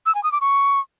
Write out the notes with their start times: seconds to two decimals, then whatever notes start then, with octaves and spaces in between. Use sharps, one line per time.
0.06 E6
0.15 G#5
0.23 D#6
0.32 D6
0.41 C#6